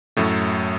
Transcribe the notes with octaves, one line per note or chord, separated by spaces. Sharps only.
F#2 A2 A3